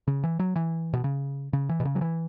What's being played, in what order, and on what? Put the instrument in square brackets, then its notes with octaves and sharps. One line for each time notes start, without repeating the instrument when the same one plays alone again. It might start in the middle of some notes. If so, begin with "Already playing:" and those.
[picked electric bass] C#3
E3
F#3
E3
B2
C#3
C#3
E3
B2
C#3
F#3
E3